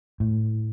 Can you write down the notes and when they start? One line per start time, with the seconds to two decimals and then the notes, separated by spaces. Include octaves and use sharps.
0.20 A2